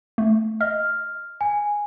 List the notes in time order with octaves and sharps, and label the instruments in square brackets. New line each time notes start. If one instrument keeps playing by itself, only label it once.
[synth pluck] A3
[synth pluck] D#5 [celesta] F6
[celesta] G#5